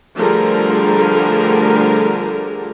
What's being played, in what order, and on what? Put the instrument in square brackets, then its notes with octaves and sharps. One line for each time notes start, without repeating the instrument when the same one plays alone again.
[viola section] D3 F3 G3 A3 G#4 A#4